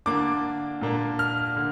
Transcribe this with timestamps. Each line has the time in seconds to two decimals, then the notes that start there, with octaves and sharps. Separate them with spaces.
0.06 D3 A#3 D4 D6
0.81 A#2 A#3 D4
1.19 F6
1.56 D3